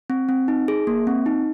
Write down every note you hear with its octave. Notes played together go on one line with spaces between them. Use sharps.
C4
C4
D#4
G#4
A#3
C4
D#4